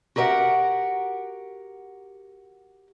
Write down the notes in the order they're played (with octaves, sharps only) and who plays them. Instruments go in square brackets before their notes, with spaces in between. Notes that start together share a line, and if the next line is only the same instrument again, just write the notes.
[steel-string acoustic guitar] F#4 G4 A#4 D#5 F#5